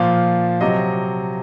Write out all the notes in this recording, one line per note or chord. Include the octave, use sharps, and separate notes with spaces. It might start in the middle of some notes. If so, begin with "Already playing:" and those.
Already playing: A#2 F3 F5
C3 F#3 D#5